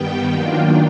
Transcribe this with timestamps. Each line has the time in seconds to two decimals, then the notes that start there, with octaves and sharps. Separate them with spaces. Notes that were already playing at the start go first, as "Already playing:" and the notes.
Already playing: G2 D#3 G3 B3 G5
0.30 D#3 F#3 A#3 D4 F4